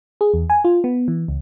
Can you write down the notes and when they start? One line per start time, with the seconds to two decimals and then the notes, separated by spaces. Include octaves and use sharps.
0.21 G#4
0.34 E2
0.50 G#5
0.64 F4
0.84 B3
1.08 E3
1.28 C#2